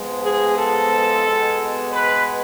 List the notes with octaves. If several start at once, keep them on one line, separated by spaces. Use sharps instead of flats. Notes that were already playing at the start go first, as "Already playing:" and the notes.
Already playing: G#2 F3 G#3 B3
G#4
A4
B2 G#3 B3
B4